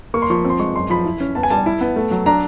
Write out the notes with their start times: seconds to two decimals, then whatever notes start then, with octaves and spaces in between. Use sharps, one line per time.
0.14 A#3 C#6
0.22 C6
0.30 F3 C#6
0.45 C4
0.50 C6
0.60 G#3 C#6
0.75 F#2 C6
0.90 F3 B5
1.06 E4
1.20 C#4
1.35 B3 A5
1.43 G#5
1.50 G3 A5
1.66 E4
1.81 B3
1.96 A3
2.11 F#3
2.26 D4 A#5